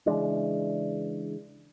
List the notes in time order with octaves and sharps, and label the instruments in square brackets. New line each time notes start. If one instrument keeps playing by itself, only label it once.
[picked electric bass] C#3 E3 G#3 D4